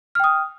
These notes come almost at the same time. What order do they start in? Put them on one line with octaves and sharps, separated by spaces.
F6 G5 D#6